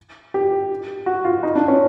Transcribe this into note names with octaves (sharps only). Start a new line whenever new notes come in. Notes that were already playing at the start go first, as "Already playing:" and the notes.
G4
F#4
F4
D#4
D4
C#4